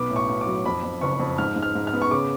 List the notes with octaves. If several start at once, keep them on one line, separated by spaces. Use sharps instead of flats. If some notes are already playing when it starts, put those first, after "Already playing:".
Already playing: B1 B3 D6
A2
C#6
B3
D6
F#3
F2 B5
F2
F#1 C#6
F2
G#2 F6
G#2
F6
G#2
F6
B3
C#6
C#3 D6